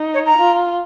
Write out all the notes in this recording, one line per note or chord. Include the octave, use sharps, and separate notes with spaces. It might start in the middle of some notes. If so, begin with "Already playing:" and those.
Already playing: D#4
C#5
A#5
F4